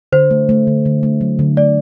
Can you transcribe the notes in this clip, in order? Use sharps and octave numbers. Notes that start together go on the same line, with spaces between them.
D3 C5
A3
A3
D3
D3
A3
F#3
D3
A3 D5